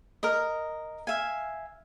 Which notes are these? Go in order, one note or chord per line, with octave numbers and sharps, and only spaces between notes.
A#4 D#5
E5 F5 G#5